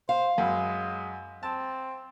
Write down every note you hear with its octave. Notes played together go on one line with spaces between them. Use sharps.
C5 F5
F#2 G#3 B5
C4 A5